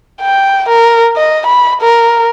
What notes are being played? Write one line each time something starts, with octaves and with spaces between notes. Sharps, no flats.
G5
A#4
D#5
B5
A#4